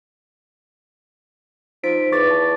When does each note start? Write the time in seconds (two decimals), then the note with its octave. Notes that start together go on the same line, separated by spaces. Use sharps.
1.84 F3 D#4 B6 D7
2.12 E2 C#6 D6 A6
2.30 A5